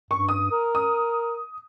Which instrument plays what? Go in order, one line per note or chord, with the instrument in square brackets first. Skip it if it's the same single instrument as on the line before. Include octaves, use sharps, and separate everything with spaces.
[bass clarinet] G2 [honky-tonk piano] C#6
[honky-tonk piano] D#6
[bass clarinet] A#4
[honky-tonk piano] D#6